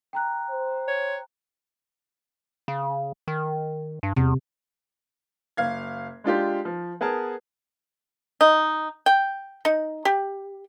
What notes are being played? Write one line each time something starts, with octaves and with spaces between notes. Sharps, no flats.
G5 A#5 F#6
C5
C#5
C#3
D#3
G2
E2 C3
F#1 F5 G#6
G#3 D4 F4 G4
F3
B3 G#4 A#4 A5
D#4
G5
D#4
G4